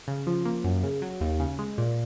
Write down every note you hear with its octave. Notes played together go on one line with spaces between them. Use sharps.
C#3
F3
A#3
F#2
C#3
F#3
D#2
C#3
G#3
A#2